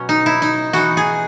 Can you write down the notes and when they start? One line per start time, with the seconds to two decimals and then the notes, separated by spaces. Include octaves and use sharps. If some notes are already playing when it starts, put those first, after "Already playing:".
Already playing: B2 F#3 C#4
0.09 D#4
0.26 E4
0.42 D#4
0.73 E3 B3 D#4 F#4
0.97 G#4